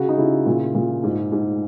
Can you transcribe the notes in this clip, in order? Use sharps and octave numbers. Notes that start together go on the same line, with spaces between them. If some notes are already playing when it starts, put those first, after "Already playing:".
Already playing: C#3 F#4
D#4
C#3 E4
A#2
A#2
G#2
G#2